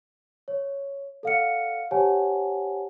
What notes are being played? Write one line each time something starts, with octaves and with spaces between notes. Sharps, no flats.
C#5
A4 D5 F5 F#5 F6 C#7
G4 C5 C#5 F#5 G#5 A5